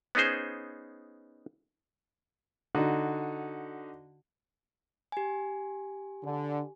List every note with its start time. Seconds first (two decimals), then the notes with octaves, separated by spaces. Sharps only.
0.15 B3 C#4 D#4 G#4 C5
2.75 D3 D#4 F#4
5.12 G4 G#5
6.23 D3